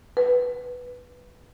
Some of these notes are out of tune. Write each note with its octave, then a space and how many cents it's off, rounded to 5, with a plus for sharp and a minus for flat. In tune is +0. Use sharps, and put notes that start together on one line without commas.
B4 +0